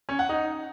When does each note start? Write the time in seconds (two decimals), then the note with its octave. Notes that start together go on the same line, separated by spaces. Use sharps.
0.09 C#4
0.19 F#5
0.29 D#4